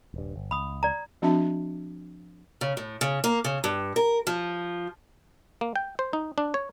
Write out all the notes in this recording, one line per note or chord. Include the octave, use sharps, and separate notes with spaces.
D#1 G2
G1
C#2 B5 D#6
D5 A#5
F3 C4 D4 F#4 E5 A5
C#3
A2
C#3
A#3
C#3
G2
A#4
F3
A#3
G5
C5
D#4
D4
C#5